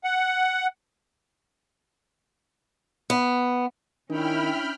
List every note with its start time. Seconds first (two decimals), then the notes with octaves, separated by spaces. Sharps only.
0.04 F#5
3.10 B3
4.10 D#3 C#4 D4 E4 G5 B5 F6